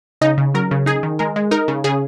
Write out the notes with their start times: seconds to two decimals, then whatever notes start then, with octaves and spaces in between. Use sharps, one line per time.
0.21 C#3 D#4 D#5
0.38 C#3
0.54 F#3 A#4
0.71 C#3
0.86 D#4 G#4
1.03 D#3
1.19 G#3 A#4
1.36 G#3
1.51 D#4 A#4
1.68 C#3
1.84 C#3 G#4